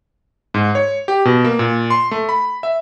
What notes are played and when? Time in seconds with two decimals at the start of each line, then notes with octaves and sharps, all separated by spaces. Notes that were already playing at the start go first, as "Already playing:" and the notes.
0.54 G#2
0.75 C#5
1.08 G4
1.25 B2
1.44 A#3
1.59 A#2
1.90 C6
2.11 A3
2.29 B5
2.63 E5